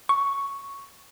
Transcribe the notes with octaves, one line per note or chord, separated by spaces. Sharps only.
C#6